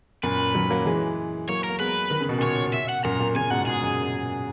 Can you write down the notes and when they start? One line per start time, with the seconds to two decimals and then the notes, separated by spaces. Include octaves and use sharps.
0.23 F#2 A#2 B4
0.55 D#3 F#3
0.70 F#3 A#3
0.86 E3 G#3
1.48 F#3 A#3 C#5
1.64 A#4
1.69 A#3
1.79 G#3 B3 B4
2.11 D#3
2.20 C#3
2.29 B2
2.38 A#2 C#3 C#5
2.74 E5
2.89 F#5
3.04 F#2 A#2 A#5
3.20 F#2 A#2
3.35 A#2 C#3 G#5
3.51 G#2 B2 F#5
3.66 G#2 G#4
3.83 F#2